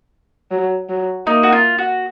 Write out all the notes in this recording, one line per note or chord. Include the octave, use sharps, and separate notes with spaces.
F#3
F#3
A#3 D#4
F#4
F4
F#4